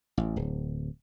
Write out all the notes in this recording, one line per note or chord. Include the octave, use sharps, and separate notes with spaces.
A1
D1